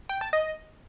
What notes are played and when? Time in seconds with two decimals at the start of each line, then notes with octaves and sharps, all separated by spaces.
0.09 G5
0.21 A5
0.33 D#5